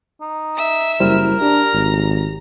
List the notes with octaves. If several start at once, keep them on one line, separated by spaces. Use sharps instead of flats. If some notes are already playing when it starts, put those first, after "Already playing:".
D#4
E5 E6
F#1 G3 E4 A#4 C5
D4 G4 A#5
G#1